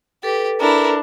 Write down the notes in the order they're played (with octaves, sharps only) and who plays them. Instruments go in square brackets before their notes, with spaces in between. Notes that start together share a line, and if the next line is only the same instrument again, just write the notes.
[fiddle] G4 [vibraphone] A4 B4
[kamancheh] D4 [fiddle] E4 [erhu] A#4